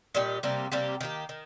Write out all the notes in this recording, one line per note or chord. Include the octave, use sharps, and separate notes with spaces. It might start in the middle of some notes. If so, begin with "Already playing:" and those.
A#2 G3 D#4 G4
C3 G3 A#3 G4
C3 G3 A#3 G4
D#3 A#3 G4
D#3